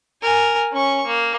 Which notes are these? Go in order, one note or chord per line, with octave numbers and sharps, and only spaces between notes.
A#4 G#5
C#4 C#6
A#3